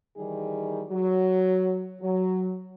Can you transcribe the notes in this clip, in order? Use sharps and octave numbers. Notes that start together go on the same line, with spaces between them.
D#3 E3 G3 D#4 G#4
F#3
F#3